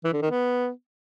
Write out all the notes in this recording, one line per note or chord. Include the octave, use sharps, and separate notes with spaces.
E3
D3
D#3
B3